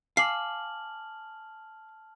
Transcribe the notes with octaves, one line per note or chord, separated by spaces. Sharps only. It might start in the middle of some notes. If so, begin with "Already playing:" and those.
F5 G#5 A5 D6 F6 C7 F#7